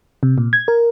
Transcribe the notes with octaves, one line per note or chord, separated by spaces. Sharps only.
C3
A#2
G#6
A#4